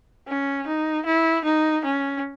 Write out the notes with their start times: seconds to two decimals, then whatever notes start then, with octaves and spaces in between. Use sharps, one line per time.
0.28 C#4
0.67 D#4
1.06 E4
1.45 D#4
1.85 C#4